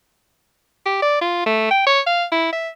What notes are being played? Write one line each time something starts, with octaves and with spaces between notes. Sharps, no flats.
G4
D5
F4
A3
G5
C#5
F5
E4
E5